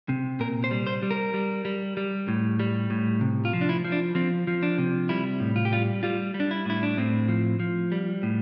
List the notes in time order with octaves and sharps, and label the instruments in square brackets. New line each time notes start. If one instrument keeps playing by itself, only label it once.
[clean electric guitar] C3
A#2 A#4
C5
G3
C5
G3
A#4
G3
G3
G3
A2
G3
A2
C3
F4
F3
D4
E4
F3
D4
F3 C4
F3
D4
C3
G3 E4
A2
F4
G4
G3 F4
G3 F4
G3
D4
E4
A2 E4
D4
A2 C4
F3
F3
G3
A2